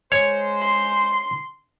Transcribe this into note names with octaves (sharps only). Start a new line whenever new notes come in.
G#3 C5 C#5
C6